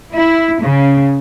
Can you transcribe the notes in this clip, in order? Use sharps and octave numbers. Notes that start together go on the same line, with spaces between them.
E4
C#3